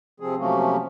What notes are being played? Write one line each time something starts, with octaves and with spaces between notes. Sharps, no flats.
C3 F3 C4 G#4
C3 F3 F#3 A3 A#3 C#4